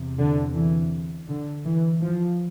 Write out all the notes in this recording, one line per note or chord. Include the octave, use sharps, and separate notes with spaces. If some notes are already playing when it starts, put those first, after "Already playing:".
Already playing: E2 C3
D3
E3
D3
E3
F3